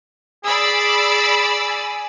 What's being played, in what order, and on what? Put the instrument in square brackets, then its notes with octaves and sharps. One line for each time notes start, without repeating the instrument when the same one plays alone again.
[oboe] G#4 [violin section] D5 B5 E6
[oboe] G#5